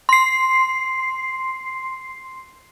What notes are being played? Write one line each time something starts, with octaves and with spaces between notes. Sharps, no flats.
C6 C7